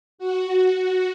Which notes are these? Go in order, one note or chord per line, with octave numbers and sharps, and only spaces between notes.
F#4